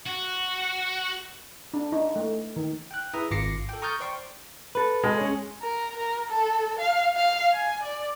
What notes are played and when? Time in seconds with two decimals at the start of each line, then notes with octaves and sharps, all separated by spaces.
0.07 F#4
1.74 D4
1.92 D#4
2.16 A3
2.56 D#3
2.91 G5 F#6
3.14 E4 G#4 B4 E5 A#5 D#6
3.31 G#1 F4 D6 A#6 C7 C#7
3.69 A4 G5
3.82 A#5 C#6 D#6 F6 G6 A6
4.00 C5 D5 G5 C6 C#6
4.75 A4 B4
5.04 G#3
5.18 C#4 G#4 C#5
5.62 A#4
5.97 A#4
6.28 A4
6.79 F5
7.16 F5
7.53 G#5
7.83 D5